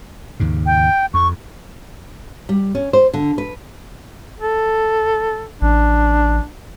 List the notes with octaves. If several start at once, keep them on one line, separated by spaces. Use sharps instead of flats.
D#2 G#2 C#3
G5
F2 C#6
G3
C#4
C5
D3
B4
A4
A1 D4